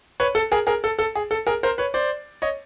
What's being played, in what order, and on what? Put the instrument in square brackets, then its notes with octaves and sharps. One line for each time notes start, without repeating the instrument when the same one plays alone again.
[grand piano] B4 C#5
A4
G#4 A#4
G#4 A#4
A4
A4
G#4
A4
G#4 A#4
A#4 C5
B4 C#5
C5 D5
C#5 D#5